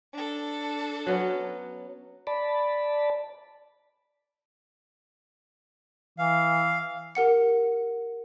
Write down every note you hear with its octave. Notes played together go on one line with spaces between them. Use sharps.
D4 A4
F#3 B3 C#4
D5 A5 B5
E3 F5
G4 A#4 F#5 C#7